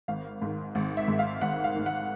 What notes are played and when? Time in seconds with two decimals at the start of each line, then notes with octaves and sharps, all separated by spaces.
0.08 G#1 F5
0.42 G#2 D#3
0.75 G#1
0.97 E5
1.08 G#2 D#3
1.19 F5
1.41 G#1 F#5
1.64 F5
1.75 G#2 D#3
1.86 F#5